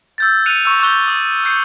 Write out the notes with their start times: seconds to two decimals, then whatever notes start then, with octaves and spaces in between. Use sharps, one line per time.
0.18 E6 G6 A6
0.46 F#6 C#7 D#7 F7
0.65 C#6 E6
0.80 C#6 D6 E6 F#6 G6 G7
1.08 D#6
1.44 E6 G6 C7 C#7